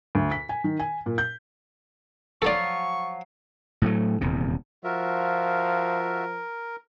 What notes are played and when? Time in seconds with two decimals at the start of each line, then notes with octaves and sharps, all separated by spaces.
0.15 D2
0.31 B6
0.49 G#5
0.64 D#3
0.79 G#5
1.06 A#2
1.18 G6
2.42 F3 F#3 F4 A4 D5 C#6
3.82 A2 F#3 A3
4.21 D#1 E2 C3
4.84 F3 F4 F#4 A#4 E5